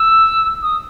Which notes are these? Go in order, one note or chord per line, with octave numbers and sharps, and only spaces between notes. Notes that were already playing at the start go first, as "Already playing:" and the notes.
Already playing: E6
D#6